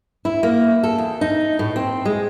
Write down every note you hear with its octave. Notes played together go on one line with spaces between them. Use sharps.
E4
A#3
A4
E2
D#4
A2
C4
G#3